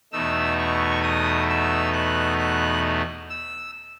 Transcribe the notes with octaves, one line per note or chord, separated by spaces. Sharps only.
E2 B2 A3 D#4 E6
C#6
D#6
E6
F#6
F#6
E6